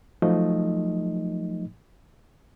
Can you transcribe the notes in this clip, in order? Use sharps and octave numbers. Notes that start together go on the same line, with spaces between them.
F3 F#3 A3 D#4 D#5